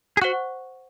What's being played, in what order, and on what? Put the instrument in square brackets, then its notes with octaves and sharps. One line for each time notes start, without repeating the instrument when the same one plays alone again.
[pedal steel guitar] G#4
[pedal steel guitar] F#4 [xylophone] C5 F#5 C#6 F#6